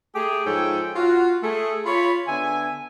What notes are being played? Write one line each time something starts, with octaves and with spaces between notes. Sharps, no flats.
A3 G4 G#4
G#2 F3 A4 C#5 G5 G#5
F4 F#4
A3 G#4
F4 C#5 B5
D3 B3 E5 G#5